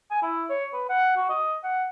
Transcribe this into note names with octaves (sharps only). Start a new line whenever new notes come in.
G#5
E4
C#5
B4
F#5
F#4
D#5
F#5